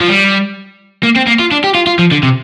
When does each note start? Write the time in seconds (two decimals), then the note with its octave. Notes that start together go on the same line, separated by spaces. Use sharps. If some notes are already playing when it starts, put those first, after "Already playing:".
0.01 F3
0.08 G3
1.03 A#3
1.16 C4
1.27 A#3
1.39 F4
1.51 D4
1.64 G4
1.75 F4
1.87 F4
1.99 F3
2.12 D3
2.23 C3